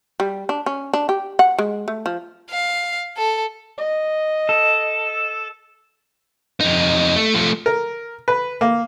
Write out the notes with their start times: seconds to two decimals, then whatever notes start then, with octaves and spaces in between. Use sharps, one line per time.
0.20 G3
0.49 D4
0.66 C#4
0.94 D4
1.09 G4
1.39 F#5
1.59 G#3
1.88 A3
2.06 F3
2.50 F5
3.17 A4
3.78 D#5
4.49 A4
6.61 F2 D#4
7.16 A3
7.34 F3 A3
7.66 A#4
8.28 B4
8.61 A#3